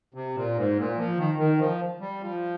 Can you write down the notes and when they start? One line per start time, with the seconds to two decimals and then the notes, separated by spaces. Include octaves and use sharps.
0.14 C3
0.35 A#2
0.56 G#2
0.77 A#2
0.97 F3
1.17 D#3
1.38 D#3
1.59 F3
2.00 G3
2.21 F3